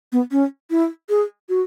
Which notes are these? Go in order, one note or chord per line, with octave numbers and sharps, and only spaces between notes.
B3
C#4
E4
G#4
F#4